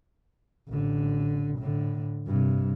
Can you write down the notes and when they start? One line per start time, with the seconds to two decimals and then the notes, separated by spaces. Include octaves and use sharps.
0.68 A1 D3
1.59 A2 D3
2.26 G2 C3